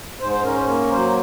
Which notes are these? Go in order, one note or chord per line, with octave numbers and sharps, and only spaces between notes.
G#2 C5
C5
C#4 A#4
C5
A#3 A#4
F#3 C5